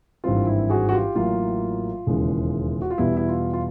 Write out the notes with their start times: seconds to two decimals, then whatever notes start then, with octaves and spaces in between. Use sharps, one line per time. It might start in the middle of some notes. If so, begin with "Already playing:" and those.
0.24 G#1 G2 E3 G3 C4 F4
0.47 E4
0.69 F#4 G#4
0.89 F#4
0.93 F4 G4
1.15 A1 A2 F#3 A#3 F4
2.07 E1 D#2 C#3 E3 G#3
2.82 F#4
2.91 F4
2.98 E2 B2 G3 B3 E4
3.17 E4
3.29 F4
3.53 F4